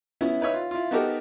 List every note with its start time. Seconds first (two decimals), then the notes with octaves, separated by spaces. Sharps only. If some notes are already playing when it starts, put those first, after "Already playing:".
0.21 B3 C#4 E4
0.41 D#4 B4 C#5 E5
0.54 F4
0.71 E4 F4
0.91 B3 D#4 F#4 G4 A4 A#4